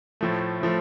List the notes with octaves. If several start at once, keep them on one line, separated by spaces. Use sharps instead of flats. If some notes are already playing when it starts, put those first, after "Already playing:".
A2 F3 A3
A2 F3 A3